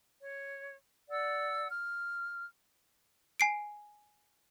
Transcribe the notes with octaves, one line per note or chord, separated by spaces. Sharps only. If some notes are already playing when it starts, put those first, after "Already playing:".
C#5
D5 F#5 E6
F6
G#5 C7 D7